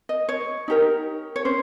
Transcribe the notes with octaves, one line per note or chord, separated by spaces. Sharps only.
D#5
C#5
D#4 G4 A#4
C#5
C#4 C5